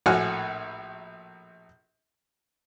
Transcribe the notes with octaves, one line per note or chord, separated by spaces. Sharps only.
A#1 A2 F#4 F#5 G#5 F6